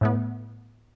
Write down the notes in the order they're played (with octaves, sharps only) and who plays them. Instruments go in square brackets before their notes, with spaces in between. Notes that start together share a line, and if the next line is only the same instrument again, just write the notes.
[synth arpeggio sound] A2 A3 B3